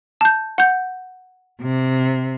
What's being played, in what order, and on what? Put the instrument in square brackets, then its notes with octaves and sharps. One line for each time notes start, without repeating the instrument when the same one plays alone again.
[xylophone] A5 G6
F#5 G6
[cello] C3